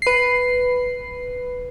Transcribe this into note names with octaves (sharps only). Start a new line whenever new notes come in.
B4 C7